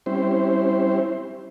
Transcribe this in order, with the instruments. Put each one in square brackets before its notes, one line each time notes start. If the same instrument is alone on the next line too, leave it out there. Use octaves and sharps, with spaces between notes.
[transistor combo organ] G3 C4 C#4 E4 C5